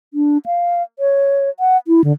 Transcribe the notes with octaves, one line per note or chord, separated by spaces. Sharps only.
D4
F5
C#5
F#5
E4
D3